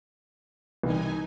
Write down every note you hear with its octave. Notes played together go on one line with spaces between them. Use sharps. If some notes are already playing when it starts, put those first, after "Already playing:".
C2 E3 D#4 G#5